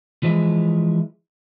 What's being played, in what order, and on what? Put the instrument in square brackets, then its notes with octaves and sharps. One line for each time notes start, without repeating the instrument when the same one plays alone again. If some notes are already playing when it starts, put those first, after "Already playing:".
[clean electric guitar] E3 F3 G#3 E4